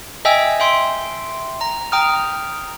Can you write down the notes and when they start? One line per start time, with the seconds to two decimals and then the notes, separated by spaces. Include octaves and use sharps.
0.25 D#5 E5 G5 G#5 E6
0.60 E5 G5 C6
1.61 A#5
1.92 G5 A#5 D#6 F6